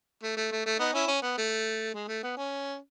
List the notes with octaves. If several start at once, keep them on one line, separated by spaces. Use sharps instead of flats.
A3
A3
A3
A3
B3 D#4
C#4 E4
C#4
B3
A3
G#3
A3
B3
C#4